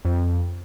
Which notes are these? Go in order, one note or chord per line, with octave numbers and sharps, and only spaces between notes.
F2